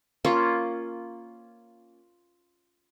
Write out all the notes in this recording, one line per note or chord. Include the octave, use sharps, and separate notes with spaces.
A#3 C#4 F4